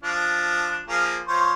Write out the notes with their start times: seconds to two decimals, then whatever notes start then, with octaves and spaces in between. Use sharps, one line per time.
0.03 F3 D4
0.88 F3 A#3 G#4
1.28 F3 C5 C#5